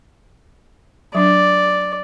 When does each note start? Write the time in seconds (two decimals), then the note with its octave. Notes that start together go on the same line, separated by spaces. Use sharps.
1.15 F#3 D4 D5